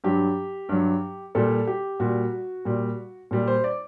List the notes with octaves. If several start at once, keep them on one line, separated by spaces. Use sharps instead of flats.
G2 F#3 G4
G2 F#3
A#2 G3 A4
G4
A#2 G3 F#4
A#2 G3
A#2 G3
C5
D5